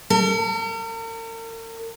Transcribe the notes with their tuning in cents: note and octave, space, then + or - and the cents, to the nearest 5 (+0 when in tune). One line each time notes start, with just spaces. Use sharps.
A#4 -45